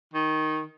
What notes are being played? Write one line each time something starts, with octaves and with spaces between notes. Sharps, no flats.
D#3